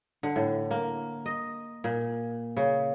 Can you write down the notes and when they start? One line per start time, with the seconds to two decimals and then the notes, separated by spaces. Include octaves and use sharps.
0.23 D3
0.36 A2
0.71 A#3
1.26 D#5
1.84 A#2
2.57 C#3